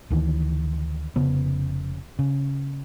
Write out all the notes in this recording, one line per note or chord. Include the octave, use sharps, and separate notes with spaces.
D2 D#3 E3
F1 C#3 B3
C#3